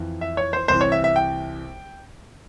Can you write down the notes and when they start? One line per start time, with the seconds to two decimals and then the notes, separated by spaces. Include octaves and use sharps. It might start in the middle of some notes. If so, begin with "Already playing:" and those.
Already playing: F2 E3
0.21 E5
0.37 C#5
0.53 C5
0.68 C2 C3 E3 C5
0.81 C#5
0.92 E5
1.04 E5
1.16 G5